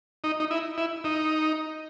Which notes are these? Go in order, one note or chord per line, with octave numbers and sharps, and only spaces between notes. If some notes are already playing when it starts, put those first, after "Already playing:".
D#4
D#4
E4
E4
D#4